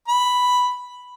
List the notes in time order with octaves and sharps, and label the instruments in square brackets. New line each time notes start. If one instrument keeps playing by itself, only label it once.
[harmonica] B5